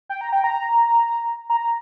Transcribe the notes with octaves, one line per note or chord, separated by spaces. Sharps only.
G5
A#5
G5
A#5
A#5